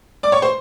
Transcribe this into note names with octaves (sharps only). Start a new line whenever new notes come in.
D5 D6
C#5 C#6
C5 C6